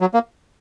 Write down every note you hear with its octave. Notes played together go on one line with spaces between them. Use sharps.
F#3
A#3